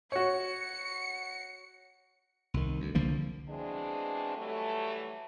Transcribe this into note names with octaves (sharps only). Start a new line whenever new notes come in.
F#4 C#5 C#7
C2 D#3
D2
C2 D3 F3 A#3
B2 E3 G#3 C4 D4
E3 F#3 G3 A3